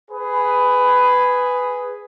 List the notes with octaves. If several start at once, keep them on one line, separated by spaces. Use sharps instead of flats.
G#4 B4